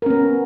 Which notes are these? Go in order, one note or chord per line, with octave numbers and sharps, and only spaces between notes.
B3 C#4 A#4